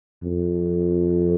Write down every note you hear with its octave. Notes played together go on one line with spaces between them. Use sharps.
F2